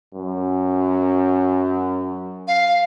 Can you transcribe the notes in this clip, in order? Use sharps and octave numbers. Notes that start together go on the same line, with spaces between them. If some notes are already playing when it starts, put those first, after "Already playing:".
F#2
F5